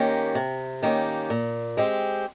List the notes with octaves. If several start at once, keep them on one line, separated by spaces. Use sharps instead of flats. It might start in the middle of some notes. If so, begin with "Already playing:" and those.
Already playing: D#3 A#3 C#4 G4
C3
D#3 A#3 C#4 G4
A#2
G#3 C4 G4